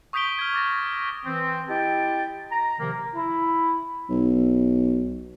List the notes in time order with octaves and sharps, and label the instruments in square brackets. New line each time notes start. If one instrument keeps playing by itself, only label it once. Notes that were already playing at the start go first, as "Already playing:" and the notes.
[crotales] C#6 D#6 G6 B6 D7 G7
F6 G#6
D6 A6 A#6
[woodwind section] E3 C4
E4 G4 D#5 G5 A5
A#5
C3 D#3 F3 A#3
[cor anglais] E4
[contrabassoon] B1